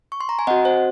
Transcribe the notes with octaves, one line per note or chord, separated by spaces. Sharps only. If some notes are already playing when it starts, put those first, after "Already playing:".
C#6
C6
A#5
G#5
C4 F#4 D#5 F#5
C5